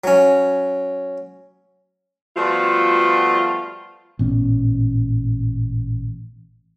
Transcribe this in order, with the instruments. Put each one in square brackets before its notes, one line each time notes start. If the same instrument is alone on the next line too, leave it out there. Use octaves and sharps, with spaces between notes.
[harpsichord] F#3 C#4
[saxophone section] F3 G3 A3 B3 F4 F#4
[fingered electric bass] A1 A#2 B3 C#4